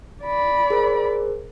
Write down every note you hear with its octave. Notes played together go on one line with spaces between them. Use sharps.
D5 B5
G#4 A#4 C5